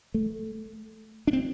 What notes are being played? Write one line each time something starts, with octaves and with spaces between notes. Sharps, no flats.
A3
D4
C4